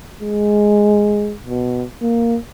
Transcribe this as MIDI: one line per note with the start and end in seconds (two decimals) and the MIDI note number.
0.20 1.35 56
1.46 1.85 47
2.02 2.38 58